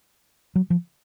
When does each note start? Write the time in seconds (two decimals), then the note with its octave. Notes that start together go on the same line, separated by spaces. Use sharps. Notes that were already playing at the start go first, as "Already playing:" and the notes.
0.55 F#3
0.70 F3